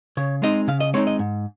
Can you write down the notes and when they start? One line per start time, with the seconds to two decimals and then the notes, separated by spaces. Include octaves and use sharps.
0.17 C#3 C#5
0.42 G#3 C4 D#4 D#5
0.68 C#3 F5
0.80 D#5
0.94 G#3 C4 D#4 C#5
1.07 D#5
1.19 G#2